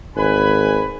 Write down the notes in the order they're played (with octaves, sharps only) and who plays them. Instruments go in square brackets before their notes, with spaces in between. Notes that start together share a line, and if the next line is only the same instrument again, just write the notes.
[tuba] G#1 [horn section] B4 G#5 B5